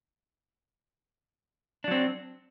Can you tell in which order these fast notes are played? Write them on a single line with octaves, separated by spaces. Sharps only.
D4 F#3 C4